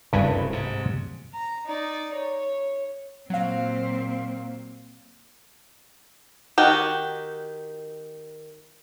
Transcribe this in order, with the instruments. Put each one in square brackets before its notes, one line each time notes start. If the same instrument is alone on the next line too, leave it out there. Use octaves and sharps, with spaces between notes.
[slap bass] D1 C2 C#3 [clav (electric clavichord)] G2 B4 G#5
[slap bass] G#2 C3
[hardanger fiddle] A#5
D#4 D5
C#5
[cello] A#2 C4 [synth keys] F#3 F5
[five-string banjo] D#3 F#4 G4